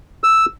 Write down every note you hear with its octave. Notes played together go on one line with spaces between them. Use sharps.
E6